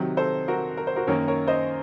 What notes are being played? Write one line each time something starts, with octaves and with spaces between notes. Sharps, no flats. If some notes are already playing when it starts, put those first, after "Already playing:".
Already playing: C3 D#3 F#3
A4 C5
F#4 A#4
A#4
C5
F#4 A#4
F#2 D#3 A#3 C#4 A#4 C#5
A#4 C#5
C5 D#5